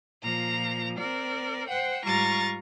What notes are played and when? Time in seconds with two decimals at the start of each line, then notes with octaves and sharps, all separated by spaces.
0.23 A#2 F3 A#5
0.99 C4 A#4 D5
1.69 C5 F#5 G5
2.05 G#2 G3 F4 A#5 C#6 A6